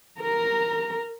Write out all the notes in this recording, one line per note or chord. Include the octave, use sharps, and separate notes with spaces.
A#4 A#5